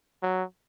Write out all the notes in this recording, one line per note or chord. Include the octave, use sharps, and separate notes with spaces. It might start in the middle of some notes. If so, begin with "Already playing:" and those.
F#3